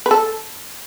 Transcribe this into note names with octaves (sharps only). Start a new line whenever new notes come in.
B4
A4